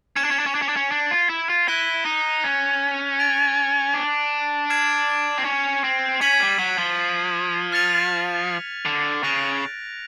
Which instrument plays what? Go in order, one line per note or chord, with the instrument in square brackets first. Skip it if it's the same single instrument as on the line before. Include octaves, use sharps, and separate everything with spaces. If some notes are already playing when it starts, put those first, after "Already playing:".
[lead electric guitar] C#4 [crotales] G#6 C#7 E7
[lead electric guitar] D4
C#4
D4
C#4
D4
C#4
D4
C#4
D4
F4
E4
F4
[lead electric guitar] E4 [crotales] F#6 A#6 D#7 G7
[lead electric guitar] D#4
C#4
[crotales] A6 D7 F7
[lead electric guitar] D4
[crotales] F6 G#6 C7 E7
[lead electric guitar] C4
C#4
C4
[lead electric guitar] C#4 [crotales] G#6 B6 D#7 F#7
[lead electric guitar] G3
F#3
F3
[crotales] F6 A6 C#7 F7
[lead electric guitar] D3
[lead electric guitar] C#3 [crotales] F#6 A#6 D7 F7